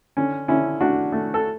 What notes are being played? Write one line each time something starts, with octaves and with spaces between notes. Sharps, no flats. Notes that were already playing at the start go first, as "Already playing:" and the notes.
D3 C#4
D3 C#4 E4
A3 D4 F#4
A3
A4